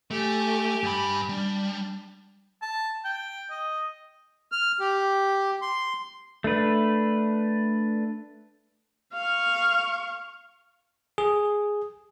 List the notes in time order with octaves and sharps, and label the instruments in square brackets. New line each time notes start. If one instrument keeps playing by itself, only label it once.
[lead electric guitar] A3 [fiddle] G4 G#5
[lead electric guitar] G2 B5
[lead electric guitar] G3 [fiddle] D4
[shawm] A5
G5
D#5
[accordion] F6
G4
C6
[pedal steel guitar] A3 D4 B4
[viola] F5 C#6
[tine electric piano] G#4